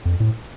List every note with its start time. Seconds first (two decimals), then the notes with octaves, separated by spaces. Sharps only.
0.05 F2
0.20 A2